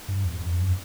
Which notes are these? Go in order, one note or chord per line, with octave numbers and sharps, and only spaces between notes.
G2
E2
F2
F#2